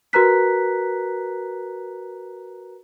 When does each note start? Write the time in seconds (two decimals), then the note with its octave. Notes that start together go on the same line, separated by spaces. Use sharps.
0.13 F#4 A#4 B4 A#5 F#6 B6